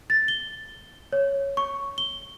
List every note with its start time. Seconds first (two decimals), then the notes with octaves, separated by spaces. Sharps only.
0.10 A6
0.28 G7
1.13 C#5
1.57 C#6
1.98 G7